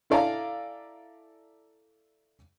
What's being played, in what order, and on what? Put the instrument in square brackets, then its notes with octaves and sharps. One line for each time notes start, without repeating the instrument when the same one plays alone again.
[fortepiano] E4 A4 D5 F5 G#5 A#5